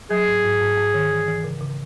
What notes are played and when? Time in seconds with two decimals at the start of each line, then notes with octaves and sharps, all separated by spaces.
0.10 F#3 G#4
0.27 G#2
0.44 G#2
0.61 G#2
0.77 G#2
0.94 D#3
1.11 E3
1.28 E3
1.44 C#3
1.61 C#3